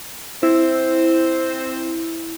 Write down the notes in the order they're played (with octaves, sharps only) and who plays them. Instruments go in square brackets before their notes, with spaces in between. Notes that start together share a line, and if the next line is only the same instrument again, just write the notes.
[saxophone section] C4 C5 [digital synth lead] E4